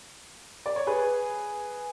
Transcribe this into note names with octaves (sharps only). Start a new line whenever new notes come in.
D5
C#5
G#4 B4